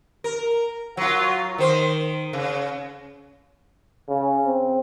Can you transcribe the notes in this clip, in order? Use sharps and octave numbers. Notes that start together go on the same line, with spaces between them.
A#4
F#3 F4
D#3 C5
C#3
C#3
C4